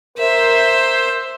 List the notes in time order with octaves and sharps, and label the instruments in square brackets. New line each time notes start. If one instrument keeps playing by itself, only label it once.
[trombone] A#4 [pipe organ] C5 [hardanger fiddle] E5